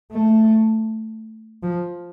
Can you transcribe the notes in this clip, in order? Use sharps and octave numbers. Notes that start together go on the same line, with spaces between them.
A3
F3